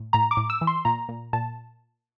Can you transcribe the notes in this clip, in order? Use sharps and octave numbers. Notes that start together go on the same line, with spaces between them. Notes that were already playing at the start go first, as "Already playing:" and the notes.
Already playing: A2
A2 A#5
D6
A2
E6
E3
C6
A#2 A#5
A#2
A#2 A5